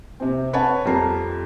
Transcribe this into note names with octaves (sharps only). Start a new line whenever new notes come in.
C3 C4
B4 C#5 F#5 A5
F2 G3 A#4 A5 A#5 C7